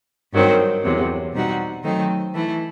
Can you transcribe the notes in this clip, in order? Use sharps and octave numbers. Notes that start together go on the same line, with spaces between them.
G2 D#3 F#3 C4
E2 C3 F#3
B2 G3 C4 D#4 F#4
D#3 F#3 A3 C4 D#4
E3 A3 E4